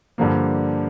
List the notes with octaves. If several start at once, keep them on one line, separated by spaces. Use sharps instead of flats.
G2 D3 F3 A#3